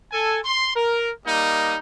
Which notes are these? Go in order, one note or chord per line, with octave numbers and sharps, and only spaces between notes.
A4 G#5
C6
A#4
G3 A#3 D#4 D#5